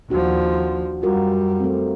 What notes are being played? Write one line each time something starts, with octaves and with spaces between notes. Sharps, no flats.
D#2 F3 D4 F#4
F#2 G3 F4 F#4 A#4
A3 C4